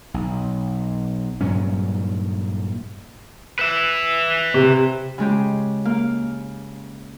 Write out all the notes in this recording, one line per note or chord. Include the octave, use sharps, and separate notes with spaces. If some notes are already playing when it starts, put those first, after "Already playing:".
B1
G2 A#2 F#3 C#4
B4 E5
C3
C#3 G#3 G4
A#3 F5